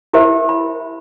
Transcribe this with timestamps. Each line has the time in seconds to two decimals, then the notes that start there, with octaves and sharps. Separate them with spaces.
0.13 E4 G4 A#4 C5 E5
0.49 B5